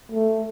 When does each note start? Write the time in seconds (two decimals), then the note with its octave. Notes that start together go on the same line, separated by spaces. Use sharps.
0.12 A3